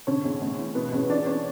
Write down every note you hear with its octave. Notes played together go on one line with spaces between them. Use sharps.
D3 C#4 C#5
E2
D2
E3
B2 B3 B4
E2 C#4 C#5
E3 D4 D5
C#4 C#5